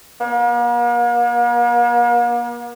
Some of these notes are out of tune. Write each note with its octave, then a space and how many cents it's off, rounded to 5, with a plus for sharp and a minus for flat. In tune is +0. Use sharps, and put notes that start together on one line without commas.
A#3 +45